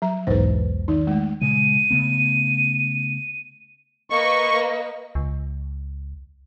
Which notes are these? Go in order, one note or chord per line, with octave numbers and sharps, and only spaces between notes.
F#3 A#5
B1 E2 G#2 B4 C5
D#3 D#4
G#3 A3
A#2 C#3 G#3 D#7
C#3 A3 B3
A#3 B4 D#5 C#6
C#2